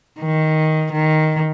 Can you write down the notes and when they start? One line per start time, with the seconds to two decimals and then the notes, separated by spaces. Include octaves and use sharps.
0.20 D#3
0.92 D#3